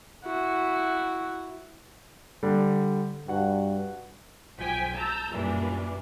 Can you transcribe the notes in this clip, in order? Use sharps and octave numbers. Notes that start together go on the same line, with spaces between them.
E4 F#4
D3 G3
G2 F#4 F#5
B1 F3 G5 G#5 B6
A5 A#5 E6 G6
F#2 A#2 E3 G3 D4